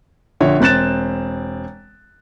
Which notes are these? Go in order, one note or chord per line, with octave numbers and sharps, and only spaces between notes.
A#1 D3 C#5
E1 C4 F#6 A6 E7